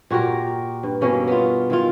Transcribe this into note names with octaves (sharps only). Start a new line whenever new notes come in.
A#2 F#4 G4 A#4
G2
B2 A#3 C#4 E4
B3 F4
D#3 E4 F4